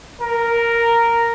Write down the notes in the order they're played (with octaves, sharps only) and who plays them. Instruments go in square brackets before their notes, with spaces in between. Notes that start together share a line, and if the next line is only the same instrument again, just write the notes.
[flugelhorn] A#4